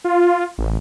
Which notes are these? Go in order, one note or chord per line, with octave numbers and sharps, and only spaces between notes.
F4
A1